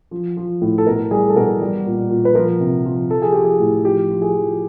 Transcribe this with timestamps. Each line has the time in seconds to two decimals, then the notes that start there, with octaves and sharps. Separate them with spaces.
0.11 F3
0.37 F3
0.62 A2
0.78 A4
0.87 B2 A#4
1.11 G3 G#4
1.29 A4
1.36 B2 A#4
1.61 G3
1.86 A#2
2.10 A#2
2.25 B4
2.35 F3 A#4
2.60 C3
2.86 F3
3.10 F3 A4
3.22 G#4
3.32 F3 G4
3.44 G#4
3.60 A2
3.85 F3 G4
4.10 F3
4.22 G#4
4.35 F3